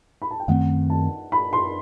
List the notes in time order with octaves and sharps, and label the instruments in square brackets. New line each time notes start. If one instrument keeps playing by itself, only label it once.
[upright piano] B5
A5
G5
[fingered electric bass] F#2 D#3 A3 C4 [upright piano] F#5
[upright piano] A5
B5
C6